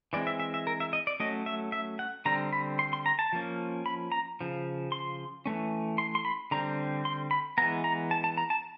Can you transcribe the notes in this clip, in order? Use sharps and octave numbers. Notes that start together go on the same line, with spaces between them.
E3 G#3 C4 D5
E5
E5
E5
A#4
E5
D#5
D5
F#3 A3 C#4 D#5
E5
E5
F#5
D3 G3 C4 A#5
B5
C6
C6
A#5
A5
F3 A#3 C#4
B5
A#5
C#3 F3
C6
E3 A3 C#4
C6
C6
B5
D3 G3 C4 A#5
C6
B5
E3 G#3 B3 A#5
A#5
A5
A5
A#5
A5